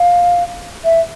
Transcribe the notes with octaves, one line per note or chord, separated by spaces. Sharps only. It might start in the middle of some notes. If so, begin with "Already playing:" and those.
Already playing: F5
E5